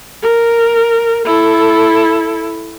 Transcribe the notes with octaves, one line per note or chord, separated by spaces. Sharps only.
A#4
E4 A4